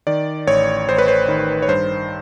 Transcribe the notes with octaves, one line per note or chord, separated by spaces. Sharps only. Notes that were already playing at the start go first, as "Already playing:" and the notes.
D#3 D5
A1 C#5
A1 C5
B4
C5
D#3
C#5
G2 C5